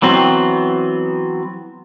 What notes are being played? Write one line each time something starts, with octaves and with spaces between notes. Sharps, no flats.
E3 F#3 B3 C4